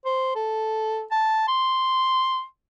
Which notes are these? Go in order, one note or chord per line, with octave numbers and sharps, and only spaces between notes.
C5
A4
A5
C6